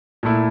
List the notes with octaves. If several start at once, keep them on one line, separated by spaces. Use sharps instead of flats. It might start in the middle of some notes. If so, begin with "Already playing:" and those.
A#2 A3 E4